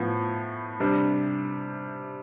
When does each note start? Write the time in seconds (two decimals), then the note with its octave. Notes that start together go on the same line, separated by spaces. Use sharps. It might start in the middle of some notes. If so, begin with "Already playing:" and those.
Already playing: A2 F3 B3
0.80 C3 G3 D4